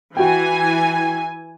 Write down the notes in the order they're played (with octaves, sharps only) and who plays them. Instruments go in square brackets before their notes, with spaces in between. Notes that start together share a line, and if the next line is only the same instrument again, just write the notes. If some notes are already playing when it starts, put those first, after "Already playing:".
[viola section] E3 G#5 [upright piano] F#4 G5